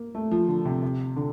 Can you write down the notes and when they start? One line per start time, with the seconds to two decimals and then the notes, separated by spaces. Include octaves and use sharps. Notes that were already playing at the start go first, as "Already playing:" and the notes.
Already playing: A#3
0.15 A3
0.31 F3
0.48 D3
0.65 C3
0.82 C3
1.16 D3